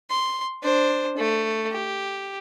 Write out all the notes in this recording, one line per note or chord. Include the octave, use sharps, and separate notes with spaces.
C6
D4 C5
A3
G4